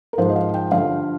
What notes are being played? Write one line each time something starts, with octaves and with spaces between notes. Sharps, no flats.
A#4
G#2 F3 C5
D#5
F5
G5
G2 D3 F3 F5